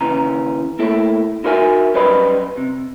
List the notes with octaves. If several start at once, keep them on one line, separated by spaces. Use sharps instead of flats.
D#2 C#3 E3 A#5
A3 A#3 E4 A4 E5
D#4 E4 F#4 A#4 E5 G#5
F#2 G3 B4 C5 D#5 B5
C3